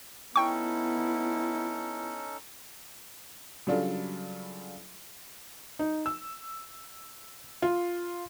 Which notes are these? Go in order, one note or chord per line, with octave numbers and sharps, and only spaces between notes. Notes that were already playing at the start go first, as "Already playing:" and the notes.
B3 C#4 D#4 E4 A4 G5 C#6
C#3 F#3 G3 D4 F4 A4
D#4
E6
F4